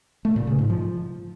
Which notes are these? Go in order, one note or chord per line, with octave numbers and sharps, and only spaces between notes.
A3
A#2
C#3
G#2
F3